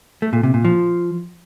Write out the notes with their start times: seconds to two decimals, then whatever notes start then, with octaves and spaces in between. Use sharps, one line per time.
0.22 A3
0.33 A#2
0.43 C3
0.54 A#2
0.65 F3